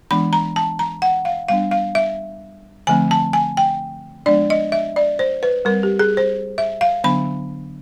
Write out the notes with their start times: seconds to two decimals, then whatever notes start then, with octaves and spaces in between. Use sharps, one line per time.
0.11 E3 G#3 B3 D4 B5
0.33 A#5
0.56 A5
0.79 A#5
1.02 F#5
1.25 F5
1.49 G3 B3 D4 F5
1.71 F5
1.95 E5
2.87 D3 F3 A3 C4 G#5
3.11 A5
3.33 G#5
3.57 G5
4.26 F3 G#3 B3 D4 D5
4.50 D#5
4.72 E5
4.96 D5
5.19 C5
5.43 B4
5.65 G3 A#4
5.69 C4
5.83 G4
5.99 G#4
6.17 C5
6.58 E5
6.81 F5
7.04 D3 F#3 B3 D4 B5